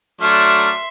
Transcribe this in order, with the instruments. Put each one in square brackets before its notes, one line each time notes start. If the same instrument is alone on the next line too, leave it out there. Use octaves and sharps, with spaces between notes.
[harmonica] F#3 A3 D4 [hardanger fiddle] E5 C6 [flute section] F6